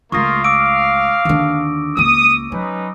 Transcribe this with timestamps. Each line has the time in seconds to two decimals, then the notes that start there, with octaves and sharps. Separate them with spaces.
0.12 C#2 A3 A#3 F4 C#6 D#6 A#6
0.44 F5 D6 E6 D7
1.25 D#2 D3
1.97 C#2 A#3 D#6
2.52 F#3 C#4 D#4 B4